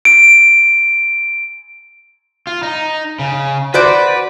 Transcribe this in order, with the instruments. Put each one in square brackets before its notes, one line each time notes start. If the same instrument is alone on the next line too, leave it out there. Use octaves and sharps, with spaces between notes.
[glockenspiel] D7
[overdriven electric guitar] F4
D#4
C#3
[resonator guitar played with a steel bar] F#4 C5 D5 [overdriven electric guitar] B4